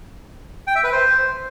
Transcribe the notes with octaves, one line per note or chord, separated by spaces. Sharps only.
G5
E5
B4
C5